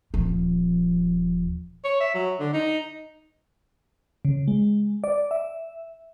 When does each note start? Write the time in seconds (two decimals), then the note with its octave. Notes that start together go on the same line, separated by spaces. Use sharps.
0.14 D#1 F3
1.84 C#5
2.00 E5
2.15 F#3
2.40 D3
2.54 D#4
4.25 C#3
4.48 G#3
5.04 D5
5.31 E5